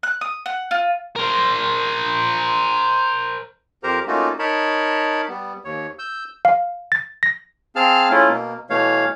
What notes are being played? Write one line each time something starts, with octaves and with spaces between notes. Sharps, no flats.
F#6
D#6
F#5
F4
A#4 C5
F2 G4 A#4 C5 A#5
A3 A#3 C#4 D#4 F4 F#4
D#4 A#4 C#5 A5 B5
G3 B3
D#2 C#5
E6 G6
F5
A6
A#6
C4 G#4 F5 A5 F6
A3 C#4 E4 F4
B2 A#3
B2 E3 A3 C#5 F5